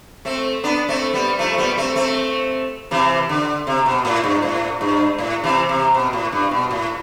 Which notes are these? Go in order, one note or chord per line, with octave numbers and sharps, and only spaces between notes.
A3 C4
B3 D4
A3 C4
G3 B3
F3 A3
A3
G3 B3
A3 C4
A3 C4
C3 E3
D3
C3
B2
A2
G2
A2
G2
A2
C3 E3
C3
B2
A2
G2
B2
A2